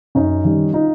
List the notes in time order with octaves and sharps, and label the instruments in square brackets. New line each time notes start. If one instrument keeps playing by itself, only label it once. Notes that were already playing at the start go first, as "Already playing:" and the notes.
[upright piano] F#2 C#4 D#4
D#3 G3
D#4 F4